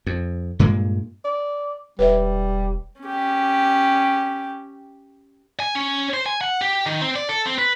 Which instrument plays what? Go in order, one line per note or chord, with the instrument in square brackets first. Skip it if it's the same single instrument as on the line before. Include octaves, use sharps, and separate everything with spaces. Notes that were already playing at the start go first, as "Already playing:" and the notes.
[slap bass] F2
G2 A#2 G#3 A#3
[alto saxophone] D5
[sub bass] E1 [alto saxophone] G3 [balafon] B4 C#5 E5
[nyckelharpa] C#4 G4
[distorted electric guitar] G#5
C#4
C5
G#5
F#5
G4
D#3
C4
D5
A4
C4
B4